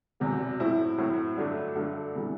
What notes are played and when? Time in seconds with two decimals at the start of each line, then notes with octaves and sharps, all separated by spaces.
0.20 E1 E2 C3 F#3 B3
0.60 A2 F#3 C4 E4
0.98 A2 F#3 C4 E4
1.37 G2 D3 F#3 A3 D4
1.75 G2 D3 F#3 A3 D4
2.15 C3 E3 G3 B3